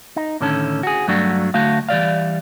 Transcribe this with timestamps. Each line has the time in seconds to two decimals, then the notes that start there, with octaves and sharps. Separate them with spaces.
0.16 D#4
0.40 A2 D3 D#3 C#4 A4
0.83 F#4 G#4
1.08 G2 F#3 A3 D4 F#4
1.54 D2 A3 F#4 F5
1.89 E3 G3 D5 F5